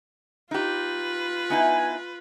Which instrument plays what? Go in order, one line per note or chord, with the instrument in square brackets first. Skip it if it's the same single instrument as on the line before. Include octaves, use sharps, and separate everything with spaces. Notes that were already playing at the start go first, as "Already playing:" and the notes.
[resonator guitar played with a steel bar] D#4 G4 [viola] F4 B4
[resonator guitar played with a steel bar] B3 D#4 E4 [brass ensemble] G#5